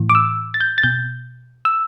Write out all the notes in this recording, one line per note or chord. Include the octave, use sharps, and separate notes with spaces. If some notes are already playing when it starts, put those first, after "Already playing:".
Already playing: A2 E3
D6
E6
A6
G6
A6
B2 G6
E6